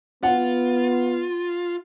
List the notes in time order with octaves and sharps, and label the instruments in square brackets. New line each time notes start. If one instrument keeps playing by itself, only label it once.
[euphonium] B3 [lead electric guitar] F4 [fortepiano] F#5